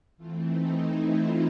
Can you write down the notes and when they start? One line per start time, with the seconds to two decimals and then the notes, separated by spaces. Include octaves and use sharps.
0.17 E3 A3 C4 F4
0.47 D#4
0.77 E4
1.07 F4